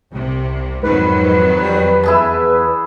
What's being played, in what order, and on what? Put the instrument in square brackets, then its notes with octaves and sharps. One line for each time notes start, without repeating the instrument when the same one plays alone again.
[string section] C2 C3
[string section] F2 D#3 F#3 [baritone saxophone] G#2 [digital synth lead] B4
[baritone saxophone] G3
[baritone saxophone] E2 [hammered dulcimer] E4 G#4 A5